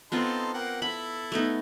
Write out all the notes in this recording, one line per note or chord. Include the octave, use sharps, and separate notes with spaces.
B3 C4 D#4 F4 A4 C6
A#3 F#5 G5
E4 A4 B5
A3 B3 D#4